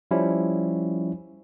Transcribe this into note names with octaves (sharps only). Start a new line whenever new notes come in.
F3 G3 C#4 E4